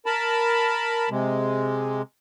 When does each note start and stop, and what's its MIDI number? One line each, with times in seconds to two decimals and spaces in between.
0.06 1.09 70
0.06 1.09 81
0.06 1.09 83
1.10 2.02 48
1.10 2.02 56